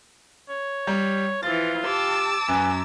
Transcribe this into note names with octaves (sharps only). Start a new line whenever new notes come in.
C#5
G3
E3 F3 F4 A6
G4 A5 D6 E6
F#2 B4 G#5